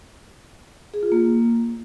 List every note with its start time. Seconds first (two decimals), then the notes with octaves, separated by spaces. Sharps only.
0.94 G#4
1.03 F4
1.12 A#3